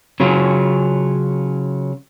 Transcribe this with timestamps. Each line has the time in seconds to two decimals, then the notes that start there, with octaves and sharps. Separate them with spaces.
0.20 C#3 F#3 C#4 F4